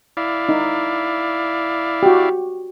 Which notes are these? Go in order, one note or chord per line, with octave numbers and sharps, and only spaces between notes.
E4 D5 F5
D#4
F#4 G4